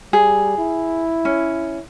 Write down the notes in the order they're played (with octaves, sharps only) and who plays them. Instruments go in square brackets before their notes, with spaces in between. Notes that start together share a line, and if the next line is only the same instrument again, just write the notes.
[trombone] G3 [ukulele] G#4
[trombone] E4
[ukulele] C#4